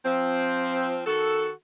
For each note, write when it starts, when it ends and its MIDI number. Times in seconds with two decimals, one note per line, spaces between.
0.05 1.01 53
0.05 1.01 60
1.06 1.50 51
1.06 1.50 66
1.06 1.50 69